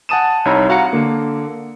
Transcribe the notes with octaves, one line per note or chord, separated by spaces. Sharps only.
F#5 G#5 A5 D#6 D#7 E7
C2 D#4 C#5 A#5 B5 E6
F#4 F5 F#5 A#5 C#7
D3 A#3